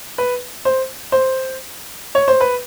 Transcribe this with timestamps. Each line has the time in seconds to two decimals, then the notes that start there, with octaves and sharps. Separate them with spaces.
0.18 B4
0.65 C5
1.12 C5
2.15 C#5
2.28 C5
2.40 B4